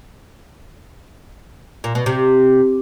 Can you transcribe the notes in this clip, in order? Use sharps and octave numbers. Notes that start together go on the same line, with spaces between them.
A#2
B2
C3